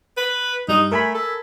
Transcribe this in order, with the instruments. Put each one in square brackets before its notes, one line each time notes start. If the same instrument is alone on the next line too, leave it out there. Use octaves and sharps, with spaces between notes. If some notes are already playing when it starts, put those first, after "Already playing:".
[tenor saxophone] B4
[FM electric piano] G2 G3 D#6 [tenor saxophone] D#4
[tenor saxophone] A3 [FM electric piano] A#4 G#5 B5
[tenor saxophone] A4